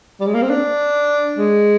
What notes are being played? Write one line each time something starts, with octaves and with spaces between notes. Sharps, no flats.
G3
G#3
A#3
C4
D4
G#3